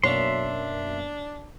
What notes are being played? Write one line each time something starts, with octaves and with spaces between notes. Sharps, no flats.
F#2 B2 A#3 D4 C#5 E5 C6